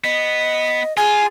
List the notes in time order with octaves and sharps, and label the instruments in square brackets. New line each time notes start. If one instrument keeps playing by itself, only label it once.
[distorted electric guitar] B3 [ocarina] D#5
[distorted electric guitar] F4 [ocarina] G#4 [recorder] G#5